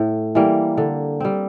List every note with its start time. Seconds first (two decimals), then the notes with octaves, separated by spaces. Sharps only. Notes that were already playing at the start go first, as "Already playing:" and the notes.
Already playing: A2
0.35 E3 G3 A#3
0.77 D3
1.20 G3 C4